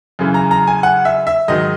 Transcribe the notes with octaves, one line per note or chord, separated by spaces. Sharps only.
F#2 C#3 E3
A#5
A#5
G#5
F#5
E5
E5
G#2 D#3 F#3 D#5